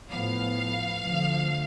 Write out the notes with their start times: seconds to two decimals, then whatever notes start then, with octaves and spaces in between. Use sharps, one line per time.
0.11 A2 F3 B3 F5
1.03 D2 D3 F3